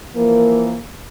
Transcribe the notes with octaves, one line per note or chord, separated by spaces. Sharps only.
E3 F3 A#3